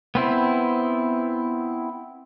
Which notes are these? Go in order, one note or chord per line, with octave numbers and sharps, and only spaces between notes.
B3 C4 E4